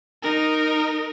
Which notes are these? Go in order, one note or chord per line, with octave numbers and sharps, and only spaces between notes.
D#4 A#4